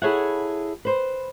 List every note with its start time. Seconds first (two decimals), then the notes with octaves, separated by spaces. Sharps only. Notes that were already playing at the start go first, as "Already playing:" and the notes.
0.02 E4 G#4 A4 C#5 E5 F#5
0.85 B4 C5